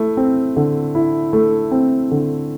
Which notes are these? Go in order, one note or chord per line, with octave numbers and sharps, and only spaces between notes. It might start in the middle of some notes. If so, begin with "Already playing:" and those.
Already playing: A3 E4
C4
D3
E4
A3
C4
D3